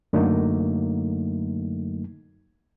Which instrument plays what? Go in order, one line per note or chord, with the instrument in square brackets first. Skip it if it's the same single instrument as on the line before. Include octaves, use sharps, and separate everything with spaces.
[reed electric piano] F#2 D3 F#3 A3 A#3 D#4